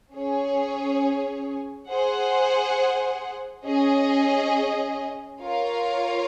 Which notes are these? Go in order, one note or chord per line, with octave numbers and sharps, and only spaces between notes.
C#4 G#4 C#5
G#4 C5 F#5
C#4 G#4 D#5
F4 A#4 C#5 F5